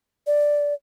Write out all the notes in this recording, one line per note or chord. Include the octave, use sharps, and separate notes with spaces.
D5